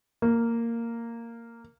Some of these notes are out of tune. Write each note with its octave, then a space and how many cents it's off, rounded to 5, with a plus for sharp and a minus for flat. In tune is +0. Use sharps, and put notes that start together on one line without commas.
A#3 -10